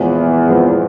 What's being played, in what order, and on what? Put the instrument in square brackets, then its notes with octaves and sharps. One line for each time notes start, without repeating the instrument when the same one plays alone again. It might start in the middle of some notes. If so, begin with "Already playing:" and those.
Already playing: [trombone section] E2 [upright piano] A#2 F3 G#3 C4
[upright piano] A#2 F3 G#3 C4